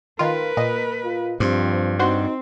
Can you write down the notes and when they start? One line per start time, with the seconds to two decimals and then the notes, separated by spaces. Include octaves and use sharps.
0.19 D#3 F4 A#4 B4
0.57 A#2 D#5
1.04 F4
1.40 G2 F3 C4
1.99 C4 D#4 F#4 C5 C6